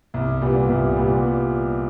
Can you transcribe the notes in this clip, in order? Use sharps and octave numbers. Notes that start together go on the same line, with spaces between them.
C2
A#2 G3 B3
C2
A#2 G3 B3